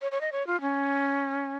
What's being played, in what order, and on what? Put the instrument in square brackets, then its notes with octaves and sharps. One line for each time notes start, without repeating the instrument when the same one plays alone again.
[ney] C#5
C#5
D#5
C#5
F4
C#4